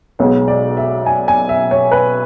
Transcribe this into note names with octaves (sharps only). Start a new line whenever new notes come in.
B1 B2 G#3 B3 C#5
D5
E5
G#5
G#5
E5
C#5
B4